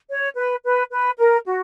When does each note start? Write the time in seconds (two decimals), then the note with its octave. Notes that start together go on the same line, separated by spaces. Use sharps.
0.10 C#5
0.37 B4
0.64 B4
0.91 B4
1.18 A#4
1.46 F#4